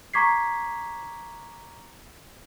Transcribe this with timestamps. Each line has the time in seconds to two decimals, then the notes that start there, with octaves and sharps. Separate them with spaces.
0.14 A#5 C#6 D6 G#6 B6 C7